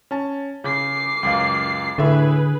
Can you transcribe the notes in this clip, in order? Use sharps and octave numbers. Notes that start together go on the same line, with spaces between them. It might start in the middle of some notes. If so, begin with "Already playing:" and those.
C#4 A5
C#3 D6 C7
C#2 F#2 F5
A2 D3 E4 G#4 B4 E5